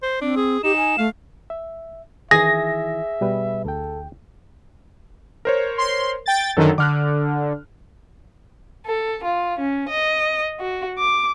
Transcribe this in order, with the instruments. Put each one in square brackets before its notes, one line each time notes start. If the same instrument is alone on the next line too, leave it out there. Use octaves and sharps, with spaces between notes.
[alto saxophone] C5
[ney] C4 [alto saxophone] D4
[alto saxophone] G#4
[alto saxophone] D#4 [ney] G4 [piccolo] E7
[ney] G#5
[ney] A3 [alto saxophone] F5
[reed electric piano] E5
[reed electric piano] D#3 E3 E4 [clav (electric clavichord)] G#4 [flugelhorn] E5 [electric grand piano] A#6
[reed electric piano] B2 G3 B4
[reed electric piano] D2 G5 [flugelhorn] A4
[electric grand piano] A#4 C5 C#5
[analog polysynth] C6
G5 A6
[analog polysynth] F#2 D#3 [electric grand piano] D3 F#3 A4
[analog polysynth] D3 [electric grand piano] D6 F6 F#6
[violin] A4
F4
C#4
D#5
F#4
D6